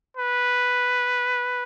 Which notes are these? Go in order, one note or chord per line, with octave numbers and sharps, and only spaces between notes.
B4